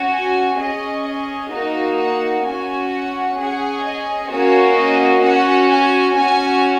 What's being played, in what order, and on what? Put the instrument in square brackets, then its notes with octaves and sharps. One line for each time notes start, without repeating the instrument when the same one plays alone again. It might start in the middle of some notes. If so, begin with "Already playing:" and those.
Already playing: [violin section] C#4 F#4
G#5
C#4 G#4 D#5
D#5
A#3 D#4 F#4 D#5
F#5
C#4 F#4 G#5
F#5
C#4 G#4 F#5
D#5
A#3 C#4 F#4 C#5
D#5
C#4 F#4 F#5
G#5
C#4 F#4 G#5